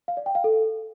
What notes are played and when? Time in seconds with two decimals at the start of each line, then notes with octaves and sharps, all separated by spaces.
0.08 F5
0.17 D5
0.26 G5
0.35 F5
0.44 A4